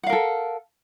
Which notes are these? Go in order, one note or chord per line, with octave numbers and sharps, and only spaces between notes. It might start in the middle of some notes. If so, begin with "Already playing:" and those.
A4 A#4 F5 F#5